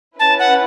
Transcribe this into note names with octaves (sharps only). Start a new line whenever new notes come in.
C#4 E4 B4 A5
F#5